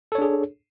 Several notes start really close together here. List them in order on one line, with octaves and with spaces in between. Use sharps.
A4 C#5 D4 G#4